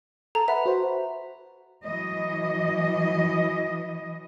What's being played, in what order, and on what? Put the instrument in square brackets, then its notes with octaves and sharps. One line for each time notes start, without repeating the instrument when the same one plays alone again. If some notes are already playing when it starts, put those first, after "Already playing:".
[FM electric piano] A4 A5 [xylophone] A#5
[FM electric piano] B4 F#5 B5 [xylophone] E5
[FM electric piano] F#4 C5
[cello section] E3 F#3 D#5